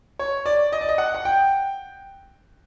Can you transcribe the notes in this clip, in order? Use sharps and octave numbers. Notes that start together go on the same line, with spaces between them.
C#5
D5
D#5
D5
D#5
F#5
F#5
G5